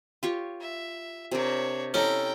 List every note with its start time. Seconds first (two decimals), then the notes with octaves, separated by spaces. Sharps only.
0.23 F4 G4 C#5
0.61 E5
1.31 C3 D4 A#4 C#5
1.94 C#4 E4 A4 D#5 G5 A#5